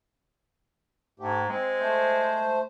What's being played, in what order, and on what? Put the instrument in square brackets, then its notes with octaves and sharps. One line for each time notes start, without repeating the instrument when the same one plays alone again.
[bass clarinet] G#2 [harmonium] A3 G4
[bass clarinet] G#3 [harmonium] C4
[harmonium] A3 C5